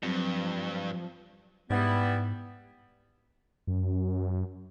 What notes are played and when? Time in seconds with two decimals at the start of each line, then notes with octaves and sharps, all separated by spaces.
0.03 G2 F3 F#3 C4
1.70 G#2 G3 B3 E4
3.67 F#2